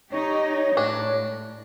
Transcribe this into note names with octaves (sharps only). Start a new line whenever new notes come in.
D#4 G4 C#5 D#5
A2 D4